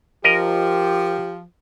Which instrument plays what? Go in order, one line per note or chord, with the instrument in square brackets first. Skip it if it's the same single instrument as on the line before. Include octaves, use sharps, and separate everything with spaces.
[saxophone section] F3 [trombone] G4 [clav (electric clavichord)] A#4 D#5